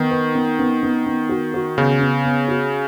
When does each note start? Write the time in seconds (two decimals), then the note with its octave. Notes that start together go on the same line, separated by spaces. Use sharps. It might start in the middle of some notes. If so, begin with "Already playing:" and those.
Already playing: D#3 B3
0.11 B4
0.35 B3
0.59 B3
0.83 B3
1.06 B3
1.29 F#4
1.54 F#4
1.78 C#3 B3
2.01 B3
2.25 B3
2.48 F#4